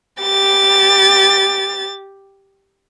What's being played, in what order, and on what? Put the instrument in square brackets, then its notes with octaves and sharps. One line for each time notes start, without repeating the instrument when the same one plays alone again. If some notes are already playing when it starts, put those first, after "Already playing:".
[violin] G4 A6